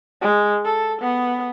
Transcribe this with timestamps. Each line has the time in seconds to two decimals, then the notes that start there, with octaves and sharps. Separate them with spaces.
0.22 G#3
0.65 A4
1.02 B3